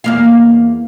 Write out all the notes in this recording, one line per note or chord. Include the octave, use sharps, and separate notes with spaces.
E2 A#3 F5